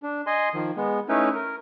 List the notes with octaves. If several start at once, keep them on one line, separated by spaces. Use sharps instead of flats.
D4
D#5 G#5 C6
D#3 F3
G#3 B3
A3 C#4 D#4 E4 B4
A#4